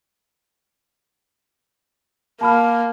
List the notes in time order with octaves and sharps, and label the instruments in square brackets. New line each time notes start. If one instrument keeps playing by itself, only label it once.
[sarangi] A#3 [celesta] A5 B5 F6